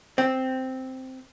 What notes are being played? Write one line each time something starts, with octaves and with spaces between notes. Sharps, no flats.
C4